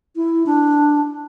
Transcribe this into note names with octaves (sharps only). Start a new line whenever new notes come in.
E4
D4